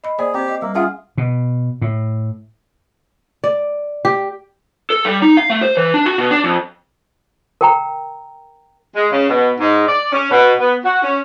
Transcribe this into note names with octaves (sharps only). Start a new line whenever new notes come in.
D#5 B5
A#3 G#4 C5 D5
C4 G4 C5
D#5
G3 A#3
C#4 F4 G#4 E5 F#5
B2
A2
D5
G4
A4
G3
D#4
F5
A3
C5
E3
D4
F#4
B2
D4
F2
A#4 G5 A#5
G#3
C#3
B2
G#2
D5
C#4
B2
B3
F#4
C#4